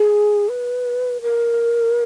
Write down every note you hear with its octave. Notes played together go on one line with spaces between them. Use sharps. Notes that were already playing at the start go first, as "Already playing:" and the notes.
Already playing: G#4
B4
A#4